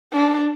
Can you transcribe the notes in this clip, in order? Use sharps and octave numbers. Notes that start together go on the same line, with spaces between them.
D4